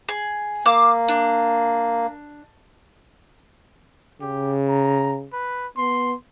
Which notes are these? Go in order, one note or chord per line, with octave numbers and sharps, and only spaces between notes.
G#4
A#3 F5 D6 E6
D4
C#3 G4
A#5
B4
B3 C6